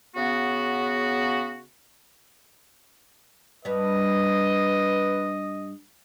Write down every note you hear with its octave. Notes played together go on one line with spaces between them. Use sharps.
C#3 B3 F#4
G2 G3 B4 D#5